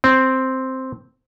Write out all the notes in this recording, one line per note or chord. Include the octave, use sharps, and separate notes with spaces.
C4